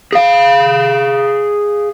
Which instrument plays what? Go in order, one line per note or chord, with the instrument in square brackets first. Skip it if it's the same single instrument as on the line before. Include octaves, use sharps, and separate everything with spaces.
[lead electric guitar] G#4 F5